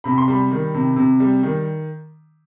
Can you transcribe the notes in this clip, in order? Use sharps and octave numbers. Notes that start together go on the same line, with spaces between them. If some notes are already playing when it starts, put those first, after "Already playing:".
C3 B5
C6
G3 B5
D#3
C3
C3
G3
D#3